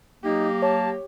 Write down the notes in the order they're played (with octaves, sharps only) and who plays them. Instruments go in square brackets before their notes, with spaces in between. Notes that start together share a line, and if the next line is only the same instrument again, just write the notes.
[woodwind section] F#3 A#3 [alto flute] D#4 [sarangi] G4
[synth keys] C#5 [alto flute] A5